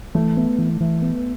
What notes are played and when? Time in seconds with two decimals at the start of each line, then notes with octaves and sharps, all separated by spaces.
0.15 E3 A3
0.37 B3
0.58 E3
0.80 E3
1.02 B3